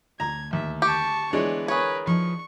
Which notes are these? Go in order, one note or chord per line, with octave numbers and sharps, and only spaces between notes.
D2 A#5 G#6
D#2 E5
G4 A5 C#6
E3 G#3 B3 D4 C#5
G#4 A#4 B4 C#5
F3 D#4 B4 C#6